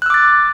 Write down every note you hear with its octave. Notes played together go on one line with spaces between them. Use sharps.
D6 E6 F#6 A6